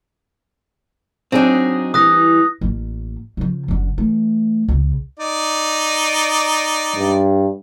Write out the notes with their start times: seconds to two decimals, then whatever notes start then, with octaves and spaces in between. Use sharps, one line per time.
1.32 F#3 C4 D4 D#4 G#4
1.94 E3 G3 D#6 F#6 A#6
2.61 A1 A#3
3.37 C#3 F3
3.68 F#1 D3
3.98 E3 A3
4.68 C#2 C#3
5.20 D#4 D5
6.96 G2